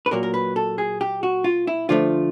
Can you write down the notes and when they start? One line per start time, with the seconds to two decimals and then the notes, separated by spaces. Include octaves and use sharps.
0.06 B4
0.11 A#2 F#3 A#3 A#4
0.23 A#4
0.34 B4
0.56 A4
0.78 G#4
1.01 G4
1.23 F#4
1.44 F4
1.67 E4
1.89 D3 F3 A3 F4